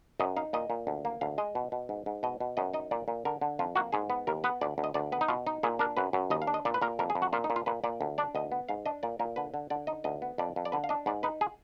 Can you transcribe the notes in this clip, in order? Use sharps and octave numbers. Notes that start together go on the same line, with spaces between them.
F#2 D#5
D#4 F5
A#2 D#5
A#2
D2
A#3
D2 F5
G#3 D#5
B2
B2
G#2
G#2
B2 D#5
B2
F#2 D#5
D#4 D#5
A#2 D5
A#2
D3 A#4
D3
F2 F4
A#3 F#4
G#2 G#4
B3
D#2 A#4
B3 B4
D2 D5
D2
D#5
D2 D5
B3 B4
D#4
B2 F4
D#4
A#2 G#4
D4 A#4
F#2 B4
F#2
D#2 D#5
F5
D4
D#5
A#2 D5
B4
A#2 A#4
F2 A#4
G#4
F2
F#4
A#2 F4
D#4
A#2
F4
A#2 B4
A#2 D5
D2
D4 D5
D2 D#5
B3
G#2 F5
D4 D#5
A#2 D5
A#2 A#4
D3 B4
D3
D3 D5
D#4 D#5
D2 D#5
B3
F2 D5
F2
D5
D3 B4
F5
D4 D#5
G#2 D5
D#4 B4
G#4